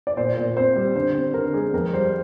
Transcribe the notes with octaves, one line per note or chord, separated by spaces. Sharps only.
D5
A#2 C5
A#2
C4 C5
G3
D3 C5
C4
D3 A#4
G#3 G#4
F2 A#4
G3 C5